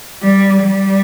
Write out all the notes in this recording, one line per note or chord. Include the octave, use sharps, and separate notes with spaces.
G3
G3